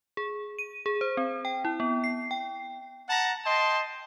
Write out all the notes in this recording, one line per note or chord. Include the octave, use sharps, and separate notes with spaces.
G#4
D#7
G#4
C5
C4
G5
E4
B3
C7
G5
F#5 A5 A#5
D#5 G5 A5 C6